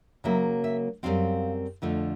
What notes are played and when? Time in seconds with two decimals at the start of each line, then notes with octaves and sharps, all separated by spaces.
0.24 C#3 F#3 A#3 E5
0.64 E5
1.03 F#2 D#3 G3 C4 F5
1.82 F2 D3 F3 A3